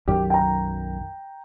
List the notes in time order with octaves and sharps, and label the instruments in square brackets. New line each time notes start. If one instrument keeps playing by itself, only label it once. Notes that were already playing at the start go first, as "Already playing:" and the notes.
[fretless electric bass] B1 F#2 D#3 [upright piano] G4
[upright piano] G5 A#5